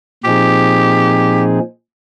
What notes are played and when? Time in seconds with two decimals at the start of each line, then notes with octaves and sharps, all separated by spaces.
0.24 A#2 F3 C4 D#4 G4 G#4